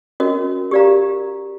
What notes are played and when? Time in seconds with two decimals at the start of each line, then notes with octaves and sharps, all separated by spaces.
0.20 C#4 F#4 A#4 D#5
0.71 G4 A#4 D5 F5 A#5